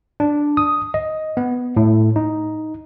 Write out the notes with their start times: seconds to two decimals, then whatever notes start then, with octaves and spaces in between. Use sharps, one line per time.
0.20 D4
0.57 D#6
0.94 D#5
1.37 B3
1.77 A2
2.16 D#4